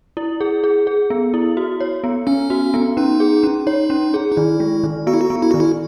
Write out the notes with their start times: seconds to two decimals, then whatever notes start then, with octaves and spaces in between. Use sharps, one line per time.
0.17 E4
0.41 G#4
0.64 G#4
0.87 G#4
1.10 B3
1.34 E4
1.57 F#4
1.80 C#5
2.04 B3
2.27 B3 C#4
2.50 F#4
2.74 B3
2.97 C#4 D#4
3.20 G#4
3.43 C#4
3.67 D#4 C#5
3.90 C#4
4.14 G#4
4.32 D#4
4.37 D#3 E4
4.60 G#3
4.84 D#3
5.07 B3 F#4
5.14 E4
5.21 F#4
5.30 B3
5.42 E4
5.51 D#3 F#4
5.60 E4